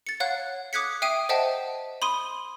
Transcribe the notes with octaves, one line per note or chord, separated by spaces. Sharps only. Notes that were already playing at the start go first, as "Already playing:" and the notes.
A6 C#7
C#5 F5 F#5 F#6
D6 D#6 F#6 G#6 B6 C#7
E5 G5 D#6 C7 D7 D#7
C5 D#5 E5 F#5 G5 A5
B5 C6 D#6 D#7